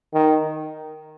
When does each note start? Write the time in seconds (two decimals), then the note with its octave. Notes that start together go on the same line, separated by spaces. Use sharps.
0.14 D#3